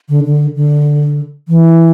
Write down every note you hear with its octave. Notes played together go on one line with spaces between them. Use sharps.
D3
D3
D3
E3